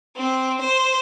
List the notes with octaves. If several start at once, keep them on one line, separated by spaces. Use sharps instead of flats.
C4
C5